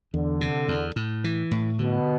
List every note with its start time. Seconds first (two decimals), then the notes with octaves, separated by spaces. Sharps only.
0.13 E2 D3
0.41 C3
0.68 E2
0.96 A2
1.24 E3
1.51 A2
1.79 B2 D3